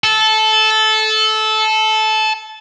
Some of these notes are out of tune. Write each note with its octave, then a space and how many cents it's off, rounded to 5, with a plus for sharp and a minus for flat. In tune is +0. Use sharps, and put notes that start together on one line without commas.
A4 -15